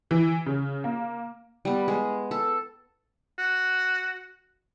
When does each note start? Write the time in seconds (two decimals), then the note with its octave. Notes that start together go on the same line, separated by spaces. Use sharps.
0.11 E3
0.46 C#3
0.84 A#3
1.65 G3 B3
1.88 G#3
2.31 A4
3.39 F#4